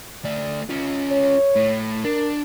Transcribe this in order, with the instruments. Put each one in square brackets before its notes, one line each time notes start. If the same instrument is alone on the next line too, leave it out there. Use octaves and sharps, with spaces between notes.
[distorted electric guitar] A3 D5
C#4 F4
[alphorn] C#5
[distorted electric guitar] A2
[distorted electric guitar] D4 [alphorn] A#4